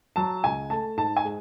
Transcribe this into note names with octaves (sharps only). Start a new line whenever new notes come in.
F#3 A5
C#2 G#5
A3 A5
G#2 A5
G#5
G#3